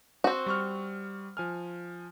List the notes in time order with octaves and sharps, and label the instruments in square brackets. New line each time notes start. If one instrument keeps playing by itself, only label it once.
[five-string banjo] C4 F#4
[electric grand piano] G3 C#6 F6
F3 G#5 F6